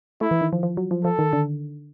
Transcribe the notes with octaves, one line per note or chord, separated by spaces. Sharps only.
A3 E4
E3
D#3
F3
F3
F#3
F3
F3 A4
D#3
D3